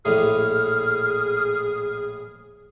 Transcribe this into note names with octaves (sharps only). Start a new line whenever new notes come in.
A#1 A2 G#4 F6